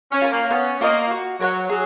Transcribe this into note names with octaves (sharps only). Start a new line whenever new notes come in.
C#4
F4 A#4
A#3
B3 C#4
A#3 F4 A#4 D#5
F#4
F#3 A#4 C#5 F#5
F#3 G#4